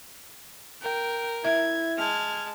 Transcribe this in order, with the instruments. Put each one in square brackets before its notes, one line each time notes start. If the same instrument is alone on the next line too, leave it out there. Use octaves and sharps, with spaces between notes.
[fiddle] A#4 [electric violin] G5
[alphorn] E4 [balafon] E5 [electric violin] G#6
[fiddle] G#3 A5 [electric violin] F6 G#6